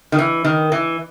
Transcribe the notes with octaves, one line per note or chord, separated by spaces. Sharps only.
D#3
E3
D#3
E3